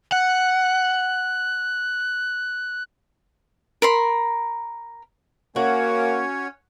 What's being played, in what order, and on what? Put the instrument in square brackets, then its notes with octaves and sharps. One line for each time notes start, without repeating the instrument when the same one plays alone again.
[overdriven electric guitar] F#5 [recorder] F#6
[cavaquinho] A#4 B5 C6
[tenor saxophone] A#3 [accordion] C#4 C#5 [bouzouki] F#4